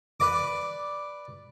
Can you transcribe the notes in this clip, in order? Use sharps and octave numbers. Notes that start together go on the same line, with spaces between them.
B4 D5 D6